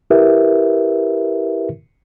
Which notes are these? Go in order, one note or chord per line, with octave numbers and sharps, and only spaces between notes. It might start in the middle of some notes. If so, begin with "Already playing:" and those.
E4 G4 A#4 B4 E5